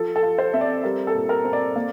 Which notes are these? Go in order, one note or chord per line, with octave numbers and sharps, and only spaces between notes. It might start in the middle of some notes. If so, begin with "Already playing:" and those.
Already playing: F3 A4
A4
F4
C5
C4 E5
D5
G3 A#4
A4
A#2
A#4
C4
D5
A#3